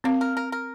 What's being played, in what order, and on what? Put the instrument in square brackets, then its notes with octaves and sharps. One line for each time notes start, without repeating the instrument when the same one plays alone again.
[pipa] A#3 [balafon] C4
[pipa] A#4
A#4
A#4